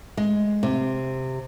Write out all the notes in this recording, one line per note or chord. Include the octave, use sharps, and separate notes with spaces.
G#3
C3